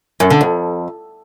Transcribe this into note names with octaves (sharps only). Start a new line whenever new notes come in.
F#2
D3
F2